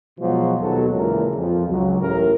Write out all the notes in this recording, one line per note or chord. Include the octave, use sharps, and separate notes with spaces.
B2 F3 F#3 G#3 F#4
D#2 B2 F#3 G#3 A4
A#2 C#3 E3 G#3 A#4
F2 F3
C#2 F#3
A1 A2 A#4